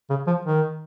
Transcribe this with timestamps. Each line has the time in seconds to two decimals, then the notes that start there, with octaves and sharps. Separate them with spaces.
0.10 C#3
0.27 F3
0.45 D#3